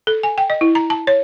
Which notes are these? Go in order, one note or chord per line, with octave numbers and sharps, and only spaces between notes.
A4
G#5
G5
D#5
E4
A#5
A5
C#5